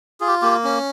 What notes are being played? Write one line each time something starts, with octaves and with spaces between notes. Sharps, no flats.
F4 G#4
G4
A#3 G4
C#4